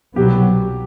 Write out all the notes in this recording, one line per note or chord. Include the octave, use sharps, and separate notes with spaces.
C2 B2 F#3 B3 G4